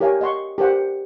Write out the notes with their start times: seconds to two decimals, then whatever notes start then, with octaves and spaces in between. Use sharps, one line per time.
0.01 G4 A#4 C#5 F5 G#5
0.21 D#5 F#5 C6 C#6
0.58 G4 A#4 C5 F#5